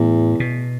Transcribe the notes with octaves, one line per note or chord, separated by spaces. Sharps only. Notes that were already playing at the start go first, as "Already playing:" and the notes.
Already playing: E2 A2
B2